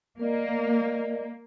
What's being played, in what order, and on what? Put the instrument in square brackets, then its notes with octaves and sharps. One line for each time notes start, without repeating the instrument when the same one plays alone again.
[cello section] A#3 [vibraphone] A#4 D5 D#5